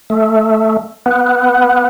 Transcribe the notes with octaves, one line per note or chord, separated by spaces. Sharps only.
A3
B3